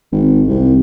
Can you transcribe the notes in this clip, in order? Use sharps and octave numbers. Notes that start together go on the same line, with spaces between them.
G#1
C2